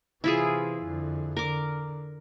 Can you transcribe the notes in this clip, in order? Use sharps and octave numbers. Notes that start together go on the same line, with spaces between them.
C3 E3 E4 F4 G#4
F2 D3
D3 A#4 D6